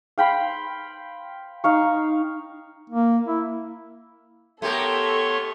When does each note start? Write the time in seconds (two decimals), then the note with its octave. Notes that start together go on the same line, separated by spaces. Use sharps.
0.18 F5 G5 B5 C6
1.64 D#4 F5 C#6
2.90 A#3
3.27 E4
4.62 A3 B3 G4 A4 A#4 C#5 C6 C#6